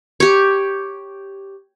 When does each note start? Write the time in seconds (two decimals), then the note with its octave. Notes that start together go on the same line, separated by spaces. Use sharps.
0.20 G4 C#5